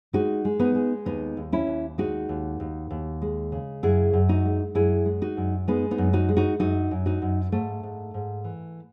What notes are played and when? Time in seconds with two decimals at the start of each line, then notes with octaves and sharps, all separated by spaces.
0.13 G#3 D#4 F#4
0.45 G#3
0.60 B3 D#4
0.75 G#3
1.05 D#2 B3 D#4
1.37 D#2
1.52 C#4 E4
1.67 D#2
1.98 G#3 D#4 F#4
2.29 D#2
2.60 D#2
2.91 D#2
3.22 G#3
3.52 C#3
3.83 F#2 E4 G#4
4.13 F#2
4.29 D#4 F#4
4.45 G#3
4.75 F#2 E4 G#4
5.06 G#3
5.22 D#4 F#4
5.37 F#2
5.68 G#3 B3 D#4
5.91 B3 D#4
5.98 F#2
6.13 D#4 F#4
6.29 G#3
6.37 D#4 F#4
6.60 F#2 D#4 F#4
6.91 F#2
7.06 D#4 F#4
7.22 F#2
7.52 G#2 A3
7.83 G#2
8.14 G#2
8.44 E3